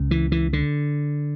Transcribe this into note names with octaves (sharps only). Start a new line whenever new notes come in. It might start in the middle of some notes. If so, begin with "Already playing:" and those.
Already playing: C#2 C#3
E3
E3
D3